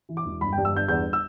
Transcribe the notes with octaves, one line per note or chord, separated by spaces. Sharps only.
E3
D6
E1
G1 B5
G5
G2
E6
G1 G6
E2 G6
E6